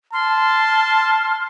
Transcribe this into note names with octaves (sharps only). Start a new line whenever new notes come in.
A5 C6 F6